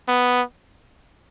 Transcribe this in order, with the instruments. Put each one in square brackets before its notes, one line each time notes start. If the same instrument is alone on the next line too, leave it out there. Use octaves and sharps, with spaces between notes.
[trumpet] B3